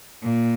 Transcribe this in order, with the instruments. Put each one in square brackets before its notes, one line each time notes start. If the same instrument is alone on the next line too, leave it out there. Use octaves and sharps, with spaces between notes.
[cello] A#2